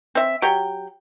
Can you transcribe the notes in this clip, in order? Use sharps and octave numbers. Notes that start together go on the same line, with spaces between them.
C4 E5
F#3 G4 G5